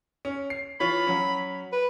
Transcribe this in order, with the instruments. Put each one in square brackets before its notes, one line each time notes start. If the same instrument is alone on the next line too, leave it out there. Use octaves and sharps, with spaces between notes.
[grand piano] C#4
C7
[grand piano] E3 F4 C#5 [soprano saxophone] B5
[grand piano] F#3 C#4
[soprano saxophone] B4